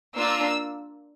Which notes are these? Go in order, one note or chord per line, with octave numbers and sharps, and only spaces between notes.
A#3 D4 F4 E6